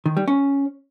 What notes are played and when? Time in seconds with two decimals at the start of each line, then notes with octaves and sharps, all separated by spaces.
0.06 D#3
0.17 G3
0.28 C#4